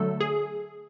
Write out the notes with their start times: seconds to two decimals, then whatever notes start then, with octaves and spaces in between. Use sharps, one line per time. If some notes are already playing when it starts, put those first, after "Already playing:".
Already playing: D3 F#3 A3 A4
0.21 G#4